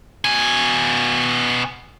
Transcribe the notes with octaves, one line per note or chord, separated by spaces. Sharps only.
B2 G#5